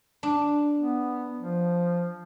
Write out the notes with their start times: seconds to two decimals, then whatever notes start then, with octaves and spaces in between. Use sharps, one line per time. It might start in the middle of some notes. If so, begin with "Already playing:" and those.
0.23 D4
0.76 B3
1.36 F3